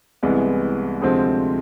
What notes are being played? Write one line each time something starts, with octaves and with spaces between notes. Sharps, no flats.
C2 C3 E3 G#3 B3
D2 C3 F3 G#3 C4